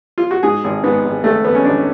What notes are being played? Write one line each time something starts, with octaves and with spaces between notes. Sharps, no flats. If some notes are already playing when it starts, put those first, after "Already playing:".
F4
F#4
G#2 G#4
G#1
G#2 B3
G#1
G#1 A3
G#1 B3
C#4
G#1 D4